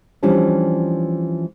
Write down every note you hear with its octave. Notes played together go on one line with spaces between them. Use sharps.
E3 F3 G3 C#4 D4